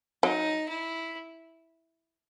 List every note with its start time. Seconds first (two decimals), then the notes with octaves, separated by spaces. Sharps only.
0.23 F#3 D#4
0.68 E4